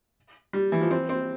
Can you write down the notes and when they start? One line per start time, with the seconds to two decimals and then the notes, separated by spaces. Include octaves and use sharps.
0.53 G3
0.72 E3
0.81 F3
0.91 C4
1.09 C4